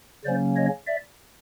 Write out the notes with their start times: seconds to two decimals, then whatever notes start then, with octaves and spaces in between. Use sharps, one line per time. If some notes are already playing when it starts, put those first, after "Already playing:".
0.25 C#3 F#3 A#3 C#4 C5 D5
0.56 C#5 D#5
0.87 D5 E5